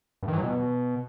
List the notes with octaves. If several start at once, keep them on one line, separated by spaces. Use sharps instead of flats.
G2
D#3
E3
F#3
B2